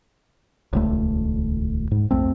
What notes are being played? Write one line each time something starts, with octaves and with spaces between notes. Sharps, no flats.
D#1 C#2 A3
G#2
B1 F2 A3 C4